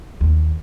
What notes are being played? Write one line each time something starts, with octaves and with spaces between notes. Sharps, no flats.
D#2